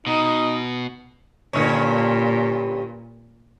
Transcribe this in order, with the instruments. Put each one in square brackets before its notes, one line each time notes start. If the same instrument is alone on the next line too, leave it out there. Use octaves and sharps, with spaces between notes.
[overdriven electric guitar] B2 [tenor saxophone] D#4
[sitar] G2 D3 C#4 [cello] A#2